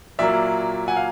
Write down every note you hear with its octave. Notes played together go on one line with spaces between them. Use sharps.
A#2 F#3 A#3 D5 E5
F#5 G#5
F5